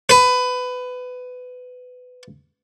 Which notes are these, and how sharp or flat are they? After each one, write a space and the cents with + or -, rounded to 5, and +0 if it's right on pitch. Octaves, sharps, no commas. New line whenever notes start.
B4 +20